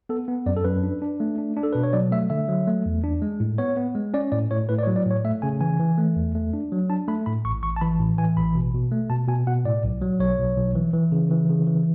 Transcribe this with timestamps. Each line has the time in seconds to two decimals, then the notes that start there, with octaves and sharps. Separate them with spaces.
0.09 B3 A4
0.28 B3
0.46 F#2 D5
0.57 A4
0.65 F#2 B4
0.83 D4
1.02 D4
1.20 A3
1.38 D4
1.57 D4
1.63 A4
1.72 B2 B4
1.83 C#5
1.93 F#3 D5
2.11 A3 E5
2.30 D3 E5
2.48 F#3
2.67 A3
2.86 E2
3.04 D4
3.22 G#3
3.40 A2
3.58 B3 C#5
3.77 B3
3.95 G#3
4.14 C#4 D5
4.32 A2 D5
4.51 A2 C#5
4.69 A2 B4
4.79 D5
4.83 C#5
4.87 F#3
4.96 D5
5.05 A2
5.10 C#5
5.25 A3 E5
5.42 C#3 G#5
5.61 E3 G#5
5.80 E3
5.98 A3
6.16 E2
6.35 A3
6.53 D4
6.72 F#3
6.89 D4 A5
7.08 A3 B5
7.26 A2 B5
7.44 A1 C#6
7.63 A1 C#6
7.76 A5
7.81 E3 B5
8.00 A2
8.18 E3 G#5
8.37 A1 B5
8.55 B2
8.74 B2
8.92 A3
9.10 B2 A5
9.28 B2 G#5
9.47 B2 F#5
9.65 A2 D5
9.84 B1
10.02 F#3
10.20 B1 C#5
10.39 B1
10.57 B1
10.75 E3
10.94 E3
11.12 C#3
11.31 E3
11.49 C#3
11.67 E3